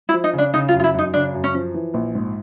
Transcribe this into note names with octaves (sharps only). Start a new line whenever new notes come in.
E4
F3
D#4
C#3
D4
C#3 D#4
F4
F#2
F4
E4
F#2 D#4
C#3 D4
F#2
C#4
F3
E3
A#1
G#2